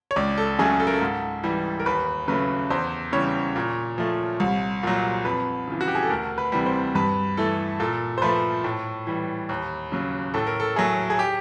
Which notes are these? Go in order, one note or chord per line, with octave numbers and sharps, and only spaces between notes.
C#5
C#2 D5
A4
C#3 F#3 A3 G#4
A4
A#4
A4
G#2
E3 G3
A#4
D#2 B4
C#3 F#3 A3 B4
E2 C5
C#3 E3 G3 C#5
A#2
F3 A3
C2
A#2 F#3
F2 B4
C#3 E3
F#4
G4
G#4
A4
D2 A#4
B4
C3 E3 G3
C5
G2 B4
E3 A3 A4
A#2 A4
C5
F3 A3 B4
A2
E3 G3
D#2
C#3 F#3
A2 A4
A#4
A4
F#3 A3 G#4
G#4
G4